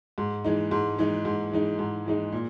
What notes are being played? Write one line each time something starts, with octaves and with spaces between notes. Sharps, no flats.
G#2
E3 G#3 D#4
G#2
E3 G#3 D#4
G#2
E3 G#3 D#4
G#2
E3 G#3 D#4
A#2